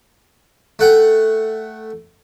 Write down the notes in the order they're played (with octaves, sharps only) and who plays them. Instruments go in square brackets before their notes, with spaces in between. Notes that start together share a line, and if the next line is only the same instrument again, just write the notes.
[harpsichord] A3 F#5 G5